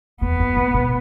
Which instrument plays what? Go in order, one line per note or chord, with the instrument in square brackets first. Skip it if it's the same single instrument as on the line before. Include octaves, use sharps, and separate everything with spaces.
[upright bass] E2 [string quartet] B3
[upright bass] F#2
A#2
B2